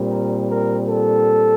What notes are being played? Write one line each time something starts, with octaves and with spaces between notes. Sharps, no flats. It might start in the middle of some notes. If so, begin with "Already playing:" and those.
Already playing: A#2 G3 C4
A#4
A#4
A4